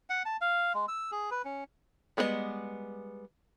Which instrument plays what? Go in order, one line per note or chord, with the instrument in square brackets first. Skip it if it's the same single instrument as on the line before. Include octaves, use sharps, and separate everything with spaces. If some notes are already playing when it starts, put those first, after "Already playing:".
[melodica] F#5
A5
F5
G#3
E6
G#4
B4
C#4
[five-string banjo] G3 G#3 B3 G#4 D#5